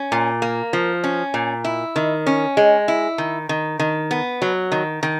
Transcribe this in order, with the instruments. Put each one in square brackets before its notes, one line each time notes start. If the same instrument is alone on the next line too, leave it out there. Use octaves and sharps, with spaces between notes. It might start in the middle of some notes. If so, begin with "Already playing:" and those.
Already playing: [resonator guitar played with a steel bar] C#4
A#2
A#3
F3
C#4
A#2
E4
D#3
C#4
G#3
E4
D#3
D#3
D#3
B3
F#3
D#3
D#3